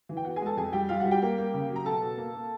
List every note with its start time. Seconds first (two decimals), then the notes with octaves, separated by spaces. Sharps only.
0.09 E3
0.17 G5
0.25 B3 F#4 F#5
0.36 G#4 G#5
0.42 G#3 A4 A5
0.57 F2 G#4 G#5
0.73 G3 G4 G5
0.89 G3 F4 F5
1.00 G3 F#4 F#5
1.11 G4 G5
1.22 A#3
1.38 A#3
1.54 C#3
1.69 F#3
1.76 A#5
1.85 B2 A4 A5
2.02 B2
2.17 A#3
2.34 A#3